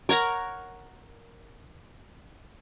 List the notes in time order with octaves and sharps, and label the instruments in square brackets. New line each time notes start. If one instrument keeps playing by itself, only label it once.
[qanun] A#4 C#5 F#5 A#5